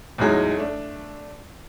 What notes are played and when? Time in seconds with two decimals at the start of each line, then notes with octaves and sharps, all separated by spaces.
0.18 E2 A2 F#3 G#3 D#4
0.57 A3 D4